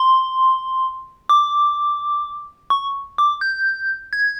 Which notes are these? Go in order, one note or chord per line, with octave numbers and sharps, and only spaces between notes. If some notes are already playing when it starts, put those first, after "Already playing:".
Already playing: C6
D6
C#6
D6
G6
G#6